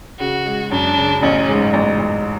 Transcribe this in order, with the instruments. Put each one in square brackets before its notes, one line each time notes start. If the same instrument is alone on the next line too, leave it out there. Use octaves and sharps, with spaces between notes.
[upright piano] C#3 [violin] F#4
[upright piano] G#3
[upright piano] F#2 [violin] D4
[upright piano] C#3
[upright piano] A1 [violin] C#4
[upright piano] G#2
A1
A1